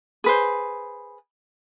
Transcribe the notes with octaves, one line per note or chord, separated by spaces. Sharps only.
G#4 B4 C5